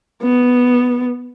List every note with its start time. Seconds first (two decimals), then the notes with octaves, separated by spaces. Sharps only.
0.22 B3